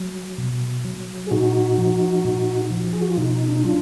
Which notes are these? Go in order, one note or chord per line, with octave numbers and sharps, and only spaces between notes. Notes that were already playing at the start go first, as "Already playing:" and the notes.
Already playing: F#3
B2
F#3
G#4
A#2 D#4 F#4
F3
A#2
F3
G#4
F#4
F4
B2 D#4
D4
D#4
F#3 D4 F4